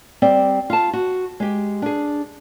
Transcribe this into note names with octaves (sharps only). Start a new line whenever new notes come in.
G3 C4 D5
F4 A5
F#4
G#3 G4
D4 G#4